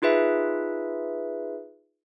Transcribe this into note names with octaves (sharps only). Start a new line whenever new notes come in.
D#4 F4 G#4 B4 E5